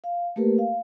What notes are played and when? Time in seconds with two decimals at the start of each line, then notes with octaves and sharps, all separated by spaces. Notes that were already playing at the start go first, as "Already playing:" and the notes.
0.04 F5
0.36 A3 A#3 G4 A#4 B4
0.58 F5